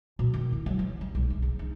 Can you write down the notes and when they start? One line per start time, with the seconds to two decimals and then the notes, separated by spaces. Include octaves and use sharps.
0.19 B2
0.34 D#3
0.52 E4
0.66 F#3
0.79 E3
1.01 G3
1.15 B1
1.30 A3
1.42 C#3
1.59 D#4